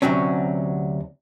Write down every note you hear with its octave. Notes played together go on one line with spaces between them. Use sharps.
D2 C3 F#3 C4 C#4